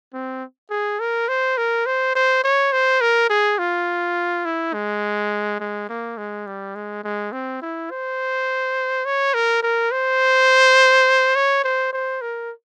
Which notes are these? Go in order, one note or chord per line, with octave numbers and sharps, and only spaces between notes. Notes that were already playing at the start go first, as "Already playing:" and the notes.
C4
G#4
A#4
C5
A#4
C5
C5
C#5
C5
A#4
G#4
F4
E4
G#3
G#3
A#3
G#3
G3
G#3
G#3
C4
E4
C5
C#5
A#4
A#4
C5
C#5
C5
C5
A#4